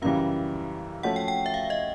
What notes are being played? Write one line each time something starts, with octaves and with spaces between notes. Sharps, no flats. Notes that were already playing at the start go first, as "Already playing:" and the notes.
F#2 C#3 E3 G3 F5
F3 A3 C#4 F#4 F#5
G5
G5
E5
F5
D#5